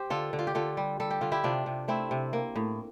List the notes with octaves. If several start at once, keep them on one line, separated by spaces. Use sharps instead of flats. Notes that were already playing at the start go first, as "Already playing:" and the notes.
Already playing: G4 C5
D3 F4 A4
D3
F4
G4
D3 F4 A4
G3
G3 A4
G4
D3 F4
E4 G4
C3 D4 F4
C3
A3 C4 E4
C3
A#3
A2